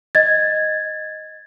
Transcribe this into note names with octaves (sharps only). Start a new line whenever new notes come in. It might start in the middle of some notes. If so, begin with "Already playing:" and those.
D#5 G#6 A6